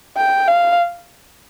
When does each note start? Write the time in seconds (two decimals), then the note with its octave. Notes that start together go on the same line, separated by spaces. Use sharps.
0.17 G5
0.48 F5